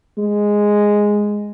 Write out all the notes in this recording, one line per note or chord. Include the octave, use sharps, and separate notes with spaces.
G#3